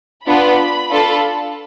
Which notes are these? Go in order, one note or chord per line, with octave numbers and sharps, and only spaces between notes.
B3 D4 F4 B5
D4 F4 A4